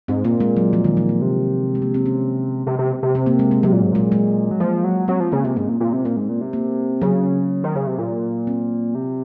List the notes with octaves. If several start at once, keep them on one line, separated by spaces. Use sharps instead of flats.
G#2 C4
A#2 A#3
G#3
F#3
F3
D#3
F3
F#3
C3
G#3
A#3
C4
C#4
C3
C3
C3
C4
A#3
G#3
G#3
C3 F#3
A#2
G#2
A#2 G#3
G#3
F#3
F3 A#3
F#3
F#3 C4
F3
C#3 A#3
C3 C4
G#2 C#4
A#2
A#2
C3
A#2 C4
G#2
A#2
C3
A#3
C#3 F#3
D#3
C#3
C3
A#2
C4
C3